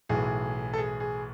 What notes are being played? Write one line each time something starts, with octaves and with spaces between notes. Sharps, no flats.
B1 A2 E3 G#4
A4
G#4
G#4